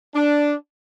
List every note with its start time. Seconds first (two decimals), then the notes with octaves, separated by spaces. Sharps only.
0.14 D4